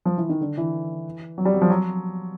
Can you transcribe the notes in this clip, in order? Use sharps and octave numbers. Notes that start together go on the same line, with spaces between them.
F3
E3
D#3
D3
E3
F#3
G3
F#3
F3
F#3